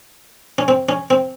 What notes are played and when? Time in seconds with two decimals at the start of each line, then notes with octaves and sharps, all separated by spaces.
0.58 C#4
0.68 C4
0.89 C#4
1.10 C4